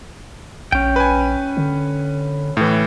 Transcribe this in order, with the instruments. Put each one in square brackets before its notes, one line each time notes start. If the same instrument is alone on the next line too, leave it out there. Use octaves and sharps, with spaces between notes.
[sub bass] A#1 [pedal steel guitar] C#4 G5
[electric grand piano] B4 G#5
[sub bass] D3
[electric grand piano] A2 E3